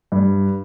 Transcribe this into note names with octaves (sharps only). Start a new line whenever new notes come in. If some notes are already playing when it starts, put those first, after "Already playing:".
G2